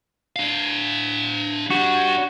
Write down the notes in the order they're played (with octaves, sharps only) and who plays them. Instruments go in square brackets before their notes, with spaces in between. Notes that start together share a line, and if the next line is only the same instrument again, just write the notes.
[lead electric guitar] D4 F5
[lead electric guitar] D4 G4 [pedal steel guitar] F#4